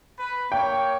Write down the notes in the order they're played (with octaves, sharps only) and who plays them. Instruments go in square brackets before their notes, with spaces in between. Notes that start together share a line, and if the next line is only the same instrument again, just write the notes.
[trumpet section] B4
[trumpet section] A#3 C#5 [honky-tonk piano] G5